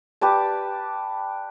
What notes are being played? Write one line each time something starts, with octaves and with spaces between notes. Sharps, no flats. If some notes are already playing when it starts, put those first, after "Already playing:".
G4 B4 D5 A5